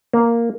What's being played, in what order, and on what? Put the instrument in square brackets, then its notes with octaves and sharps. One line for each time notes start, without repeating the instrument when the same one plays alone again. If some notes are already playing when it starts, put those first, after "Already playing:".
[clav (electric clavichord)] A#3